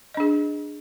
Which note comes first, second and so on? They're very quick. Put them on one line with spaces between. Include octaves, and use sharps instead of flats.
D#5 D4 G#4